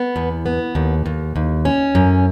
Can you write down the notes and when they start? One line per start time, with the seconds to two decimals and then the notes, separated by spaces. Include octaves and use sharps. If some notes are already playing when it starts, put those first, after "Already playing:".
Already playing: B3
0.16 E2
0.46 B3
0.75 D#2
1.06 D#2
1.36 D#2
1.65 C#4
1.95 F#2